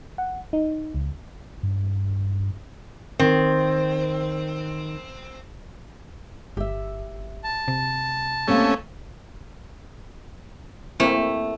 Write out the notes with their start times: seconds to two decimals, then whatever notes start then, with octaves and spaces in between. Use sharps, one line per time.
0.18 F#5
0.53 D#4
0.95 C#2
1.63 G2
3.20 D#3 C4
6.57 G1 G4 E5
7.44 A5
7.68 C3
8.48 A3 A#3 C4 C#4 G4
11.00 A3 A#3 C4 E4